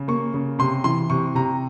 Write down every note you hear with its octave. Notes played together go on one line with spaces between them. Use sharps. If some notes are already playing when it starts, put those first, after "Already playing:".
Already playing: C#3
A#3 C#6
C#3
C3 C6
E3 C6
C3 C#6
C3 A#5